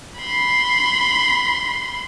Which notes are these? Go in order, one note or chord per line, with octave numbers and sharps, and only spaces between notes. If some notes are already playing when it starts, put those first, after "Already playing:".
B5 C6